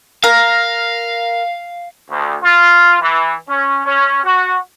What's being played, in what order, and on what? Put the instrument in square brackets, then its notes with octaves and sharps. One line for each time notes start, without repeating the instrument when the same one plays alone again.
[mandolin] A#4 [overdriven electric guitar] F5
[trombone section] D2
F4
E3
C#4
C#4
F#4